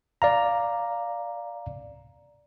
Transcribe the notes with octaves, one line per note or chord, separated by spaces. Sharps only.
D5 F5 A#5